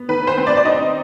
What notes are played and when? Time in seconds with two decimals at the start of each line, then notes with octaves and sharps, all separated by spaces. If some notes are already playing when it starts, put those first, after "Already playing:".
Already playing: B3
0.09 D#3 B4
0.27 C5
0.38 C4
0.47 D5
0.57 D5
0.65 D#4 D#5